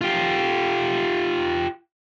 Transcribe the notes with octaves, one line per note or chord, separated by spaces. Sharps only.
F4 G4